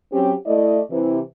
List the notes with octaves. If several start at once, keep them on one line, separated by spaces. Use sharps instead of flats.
F#3 C4 C#4 G4
A3 E4 D5 D#5
C3 E3